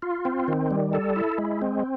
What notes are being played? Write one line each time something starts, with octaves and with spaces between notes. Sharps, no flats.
F4
C4
D#3
G3
A4
E4
G#3
C4